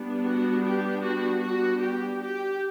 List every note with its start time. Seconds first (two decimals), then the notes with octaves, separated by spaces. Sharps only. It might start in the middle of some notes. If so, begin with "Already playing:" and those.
Already playing: G3 B3 D4
0.25 F#4
0.64 G4
1.04 F#4
1.42 F#4
1.81 G4
2.21 G4